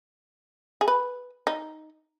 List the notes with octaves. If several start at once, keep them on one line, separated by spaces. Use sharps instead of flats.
G#4
B4
D#4